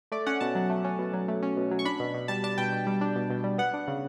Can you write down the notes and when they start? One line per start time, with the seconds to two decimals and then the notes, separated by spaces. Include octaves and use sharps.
0.12 A3 D5
0.26 C#4 F#5
0.40 B2 A5
0.55 F#3
0.70 A3
0.84 C#4
0.99 B2
1.13 F#3
1.28 A3
1.42 C#4
1.57 B2
1.71 F#3
1.79 C#6
1.85 D4 B5
2.00 B2
2.14 B2
2.28 G3 A5
2.44 D4 A5
2.58 B2 G5
2.72 B2
2.87 G3
3.01 D4
3.16 B2
3.30 B2
3.44 G3
3.58 B3 F#5
3.74 D4
3.88 C#3